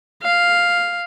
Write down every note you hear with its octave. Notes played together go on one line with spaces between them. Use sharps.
F5